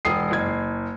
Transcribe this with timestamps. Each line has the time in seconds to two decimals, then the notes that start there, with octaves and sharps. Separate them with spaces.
0.05 E1 D#6 C7
0.31 F#1 G#6